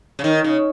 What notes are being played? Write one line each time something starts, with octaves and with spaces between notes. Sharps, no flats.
C#3
D#3
C#3